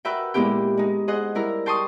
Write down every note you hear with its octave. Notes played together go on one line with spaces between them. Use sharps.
F#4 A#4 B4 E5 F#5 G5
A#2 G#3 B3 E4 G4 G5
G#3 D#4
G#4 C5 D#5 F#5
G3 E4 A#4 A#5
G5 A5 C6 C#6 D#6